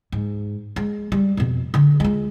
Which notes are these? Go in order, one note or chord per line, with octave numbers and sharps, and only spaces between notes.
G#2
G#3
G3
F2 B2
D3
G#3 F4